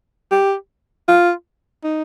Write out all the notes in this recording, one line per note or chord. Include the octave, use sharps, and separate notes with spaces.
G4
F4
D#4